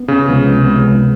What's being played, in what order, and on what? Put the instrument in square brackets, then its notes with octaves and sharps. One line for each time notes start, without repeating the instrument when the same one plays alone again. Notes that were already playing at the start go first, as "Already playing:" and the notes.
Already playing: [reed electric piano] B3
[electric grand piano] C#3
[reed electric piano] C#2 C3 F3 G#3 B3
C#2 C3 F3 G#3 B3